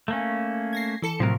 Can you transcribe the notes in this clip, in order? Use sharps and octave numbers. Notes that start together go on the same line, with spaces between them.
A3 A#3 C#4
G#6 A#6 C7
E3 A4 C#7
A2 C3 F3 F#3 A#4